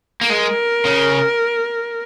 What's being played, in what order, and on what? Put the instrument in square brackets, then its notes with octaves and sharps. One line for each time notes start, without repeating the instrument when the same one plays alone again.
[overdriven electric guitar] A#3
[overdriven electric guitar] G#3 [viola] A#4
[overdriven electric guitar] C#3